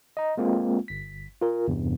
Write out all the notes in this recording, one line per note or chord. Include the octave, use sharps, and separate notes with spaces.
D#5 A#5
G#3 A#3 C4 F4
G1 B6
F4 A#4
E2 G2 C3